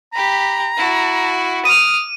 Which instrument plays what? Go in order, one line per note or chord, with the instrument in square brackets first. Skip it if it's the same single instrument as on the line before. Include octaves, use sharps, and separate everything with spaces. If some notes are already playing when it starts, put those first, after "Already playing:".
[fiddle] G4 B5 [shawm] A#5
[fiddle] E4 F#4
[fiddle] D6 F6 [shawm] D#6 [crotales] D#7